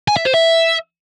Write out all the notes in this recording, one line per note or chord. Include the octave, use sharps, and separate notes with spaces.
G#5
E5
C5
E5